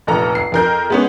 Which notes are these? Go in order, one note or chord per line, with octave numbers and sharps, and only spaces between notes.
F1 A#1 A4 A#5
C7
F2 A#4 G6
G#3 B3 C#4